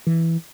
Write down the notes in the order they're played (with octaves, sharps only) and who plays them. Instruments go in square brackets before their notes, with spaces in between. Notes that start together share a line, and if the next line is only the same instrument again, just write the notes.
[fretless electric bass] E3